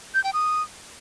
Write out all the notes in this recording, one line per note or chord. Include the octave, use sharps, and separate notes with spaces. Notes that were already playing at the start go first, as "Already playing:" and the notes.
G6
G5
D#6